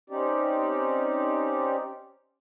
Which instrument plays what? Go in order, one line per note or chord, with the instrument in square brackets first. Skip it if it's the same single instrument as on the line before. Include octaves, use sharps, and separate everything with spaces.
[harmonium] C4 C#4 D#4 G4 D5